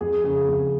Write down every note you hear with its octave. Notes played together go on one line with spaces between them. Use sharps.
F2 G#4
C#3 G#4
F2